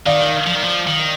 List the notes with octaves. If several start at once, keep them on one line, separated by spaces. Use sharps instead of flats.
D#3 D5 F5
F3
D#3
F3
D#3